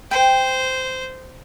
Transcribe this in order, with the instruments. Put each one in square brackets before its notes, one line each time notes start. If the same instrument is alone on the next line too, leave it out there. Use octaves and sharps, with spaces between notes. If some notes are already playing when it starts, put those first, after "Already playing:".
[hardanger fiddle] C5 [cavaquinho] G5